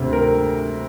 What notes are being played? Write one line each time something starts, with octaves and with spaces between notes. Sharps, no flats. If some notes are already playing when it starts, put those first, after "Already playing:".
Already playing: D2 C3
A#4